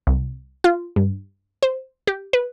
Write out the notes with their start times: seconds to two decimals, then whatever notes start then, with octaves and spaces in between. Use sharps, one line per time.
0.07 C2
0.64 F4
0.96 G2
1.63 C5
2.07 G4
2.33 B4